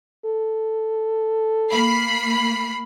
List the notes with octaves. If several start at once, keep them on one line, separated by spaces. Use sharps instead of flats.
A4
A#3 B5 C7